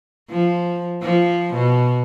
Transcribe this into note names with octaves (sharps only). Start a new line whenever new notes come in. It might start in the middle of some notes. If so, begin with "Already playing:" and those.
F3
F3
B2